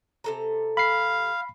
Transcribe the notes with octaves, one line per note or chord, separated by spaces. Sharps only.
C3 A4 A#5
F5 B5 C7